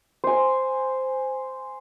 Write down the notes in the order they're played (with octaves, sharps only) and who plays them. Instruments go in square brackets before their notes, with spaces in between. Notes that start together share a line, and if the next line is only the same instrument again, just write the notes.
[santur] C5 G#5